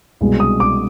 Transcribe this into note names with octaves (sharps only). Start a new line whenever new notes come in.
C2 B2 G#3
D#6
D6